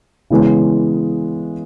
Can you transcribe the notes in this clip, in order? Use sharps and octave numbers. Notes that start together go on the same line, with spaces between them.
C#3 E3 G#3 B3